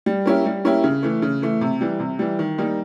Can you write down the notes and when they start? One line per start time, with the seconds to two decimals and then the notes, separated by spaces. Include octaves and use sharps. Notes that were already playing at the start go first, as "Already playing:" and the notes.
0.06 G3
0.26 A#3 C#4 E4 G4
0.46 G3
0.65 A#3 C#4 E4 G4
0.84 C#3
1.03 E3 A3
1.22 C#3
1.42 E3 A3
1.61 C3
1.81 E3 G3
2.00 C3
2.19 E3 G3
2.39 D#3
2.58 G3 A#3 D#4